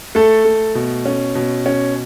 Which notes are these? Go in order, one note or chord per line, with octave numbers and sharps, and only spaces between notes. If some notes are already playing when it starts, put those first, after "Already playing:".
A3 A4
A3
B2
C#4
B2
C#4